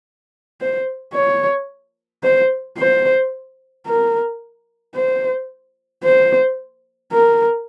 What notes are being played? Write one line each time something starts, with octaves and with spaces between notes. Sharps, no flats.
C5
C#5
C5
C5
A#4
C5
C5
A#4